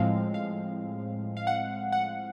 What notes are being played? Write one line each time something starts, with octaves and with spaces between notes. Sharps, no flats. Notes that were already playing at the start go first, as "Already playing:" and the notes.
Already playing: A2 F3 G#3 C4 F5
F5
F5
F#5
F#5